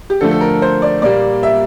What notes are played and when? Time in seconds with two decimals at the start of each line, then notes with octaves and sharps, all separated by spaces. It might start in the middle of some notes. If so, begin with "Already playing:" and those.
0.10 G4
0.21 D3 F3 A3 A4
0.31 A4
0.41 A#4
0.62 C5
0.82 D5
1.02 A#2 G3 A#3 D5
1.43 E5